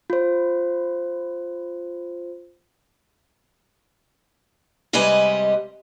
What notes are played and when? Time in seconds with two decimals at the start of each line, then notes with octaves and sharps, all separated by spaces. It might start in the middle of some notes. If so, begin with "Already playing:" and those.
0.10 F4 C5
4.93 C3 G3 G#3 B4 D#5 G#5